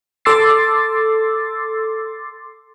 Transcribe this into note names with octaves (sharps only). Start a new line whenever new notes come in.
A4 C6 D6 E6 A6 C7